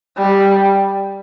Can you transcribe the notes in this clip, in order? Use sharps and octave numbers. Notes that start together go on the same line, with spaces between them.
G3